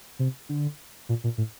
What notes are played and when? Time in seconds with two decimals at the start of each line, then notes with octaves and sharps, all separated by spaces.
0.19 C3
0.49 D3
1.09 A#2
1.24 A#2
1.38 A2